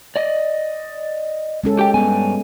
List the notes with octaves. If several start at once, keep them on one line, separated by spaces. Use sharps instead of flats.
D5 D#5
G#3 C#4 A4
G4 G5
G2 B3 G#5